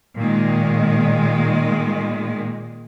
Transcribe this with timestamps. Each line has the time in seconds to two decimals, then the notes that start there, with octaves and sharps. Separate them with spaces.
0.17 A#2 D#3 G#3